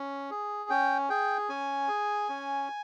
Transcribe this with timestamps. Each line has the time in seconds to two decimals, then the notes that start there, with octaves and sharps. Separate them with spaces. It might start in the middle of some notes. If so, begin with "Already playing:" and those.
Already playing: C#4
0.31 G#4
0.70 C#4 G5
1.10 G#4 G5
1.49 C#4 G#5
1.88 G#4
2.29 C#4